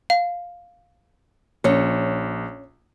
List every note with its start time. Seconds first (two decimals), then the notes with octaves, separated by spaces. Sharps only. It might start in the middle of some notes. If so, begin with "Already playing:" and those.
0.10 F5
1.64 A#1 C#4 C#5